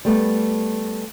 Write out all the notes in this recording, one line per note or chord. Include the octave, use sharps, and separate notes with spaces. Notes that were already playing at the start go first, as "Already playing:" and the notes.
G3 A3 B3